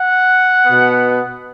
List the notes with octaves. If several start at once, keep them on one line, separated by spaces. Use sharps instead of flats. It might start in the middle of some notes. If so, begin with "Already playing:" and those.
Already playing: F#5
B2 B3